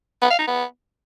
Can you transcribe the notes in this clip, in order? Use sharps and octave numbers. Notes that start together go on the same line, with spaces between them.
B3
F5
D#4
B3